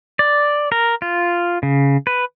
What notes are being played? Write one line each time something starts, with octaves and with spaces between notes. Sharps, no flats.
D5
A#4
F4
C#3
B4